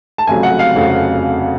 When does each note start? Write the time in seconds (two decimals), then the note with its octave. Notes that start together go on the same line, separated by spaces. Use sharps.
0.18 A5
0.27 F1 F2 C#3 F#3 G#5
0.43 F#5
0.59 F5
0.75 F1 F2 C#3 F#3